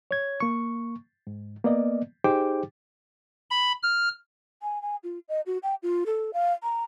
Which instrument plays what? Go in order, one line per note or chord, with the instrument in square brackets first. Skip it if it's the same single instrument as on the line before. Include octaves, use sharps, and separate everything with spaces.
[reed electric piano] C#5 G#6
A#3 C#6
G#2
A#3 B3 D5 D#5
D#4 G4 G#4 C5 G5 D6
[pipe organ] B5
F6
[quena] G#5
G#5
F4
D#5
F#4
G5
F4
A4
F5
A#5